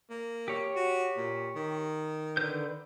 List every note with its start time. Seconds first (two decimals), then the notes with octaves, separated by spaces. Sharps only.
0.10 A#3
0.48 G4 C#5
0.76 F#4
1.17 A#2
1.56 D#3
2.37 D3 B4 G6